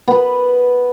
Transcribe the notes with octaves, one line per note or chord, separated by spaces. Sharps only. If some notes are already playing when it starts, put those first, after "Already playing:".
B3 B4